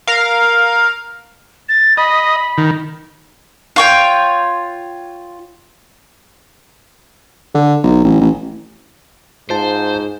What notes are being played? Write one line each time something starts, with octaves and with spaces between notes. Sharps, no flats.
A#4 F5
A6
D#5 B5
D#3
F4 C#5 G5
D3
B1
A1
A1
G#2 F4 C5 A5